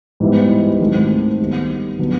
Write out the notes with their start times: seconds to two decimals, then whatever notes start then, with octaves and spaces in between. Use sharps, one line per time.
0.20 G#2 E3 G3 B3 E4
0.80 G#2 D#3 F#3 A3 C4
1.40 D#3 G3 B3
1.99 D3 F#3 B3 D4